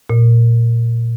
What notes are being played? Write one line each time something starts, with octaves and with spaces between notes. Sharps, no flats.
A#2